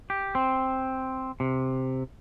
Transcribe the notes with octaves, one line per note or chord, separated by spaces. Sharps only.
G4
C4
C3